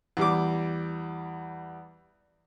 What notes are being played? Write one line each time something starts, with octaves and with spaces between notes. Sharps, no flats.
E2 G3 D6